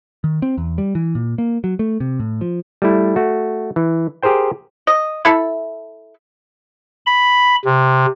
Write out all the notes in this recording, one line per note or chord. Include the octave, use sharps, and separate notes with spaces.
D#3
C4
E2
G3
E3
A#2
A#3
F#3
A3
C3
A2
F3
G3 A3 E4
A3 F#4
E3
G4 G#4 A#4 C5 G5
D#5
E4 A4
B5
C3